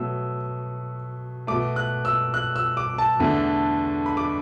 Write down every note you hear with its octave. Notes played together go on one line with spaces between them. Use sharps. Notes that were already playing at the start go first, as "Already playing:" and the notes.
Already playing: B2 F#3 A3 E6
B2 A3 D6
F#6
E6
F#6
E6
D6
A5
E2 D3 A3
B5
D6